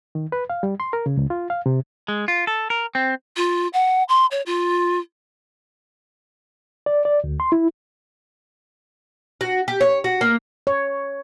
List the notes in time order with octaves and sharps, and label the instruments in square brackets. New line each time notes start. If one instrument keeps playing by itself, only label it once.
[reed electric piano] D#3
B4
F5
G3
C6
A#4
C#3
C#2
F4
F5
C3
[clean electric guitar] G#3
F4
A4
A#4
C4
[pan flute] F4
F#5
C6
C#5
F4
[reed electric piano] D5
D5
D2
C6
E4
[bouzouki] F#4
G4
C#5
F#4
A#3
[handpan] C#5